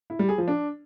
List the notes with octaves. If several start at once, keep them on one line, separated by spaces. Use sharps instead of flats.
E4
G3
G#4
F3
D4